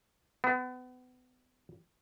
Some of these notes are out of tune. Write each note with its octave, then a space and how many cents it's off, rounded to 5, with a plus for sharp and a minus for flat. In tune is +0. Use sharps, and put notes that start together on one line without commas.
B3 +35